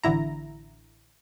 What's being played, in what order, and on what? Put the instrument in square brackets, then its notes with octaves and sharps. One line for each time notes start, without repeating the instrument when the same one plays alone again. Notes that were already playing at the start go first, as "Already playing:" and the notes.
[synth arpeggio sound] A1 D3 E4 A#5